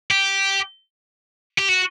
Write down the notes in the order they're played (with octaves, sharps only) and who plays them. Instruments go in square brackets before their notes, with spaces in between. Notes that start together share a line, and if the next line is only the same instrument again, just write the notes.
[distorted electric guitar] G4
G4
F#4